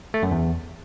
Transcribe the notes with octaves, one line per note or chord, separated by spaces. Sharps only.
A3
F#2
E2